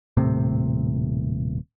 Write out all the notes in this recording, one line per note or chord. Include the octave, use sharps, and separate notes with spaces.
D#1 A2 C3 C4